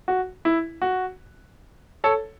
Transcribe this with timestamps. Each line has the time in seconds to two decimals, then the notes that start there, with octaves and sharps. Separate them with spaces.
0.08 F#4
0.45 E4
0.82 F#4
2.04 A4 C#5